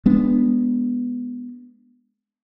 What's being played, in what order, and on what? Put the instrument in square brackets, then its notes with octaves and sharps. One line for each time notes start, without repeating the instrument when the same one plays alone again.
[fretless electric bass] G#3 B3 D4